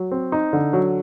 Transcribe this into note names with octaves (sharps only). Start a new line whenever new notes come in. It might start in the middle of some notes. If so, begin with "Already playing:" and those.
Already playing: F#3
C4
D#4
D3
F#3